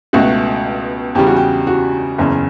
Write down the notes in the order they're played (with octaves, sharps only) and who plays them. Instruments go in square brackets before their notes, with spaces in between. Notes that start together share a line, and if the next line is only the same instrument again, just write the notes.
[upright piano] C#2 B2 A3 F#4
E2 C#3 G3 G4
F#4
G4
F#4
F#1 E2 C#3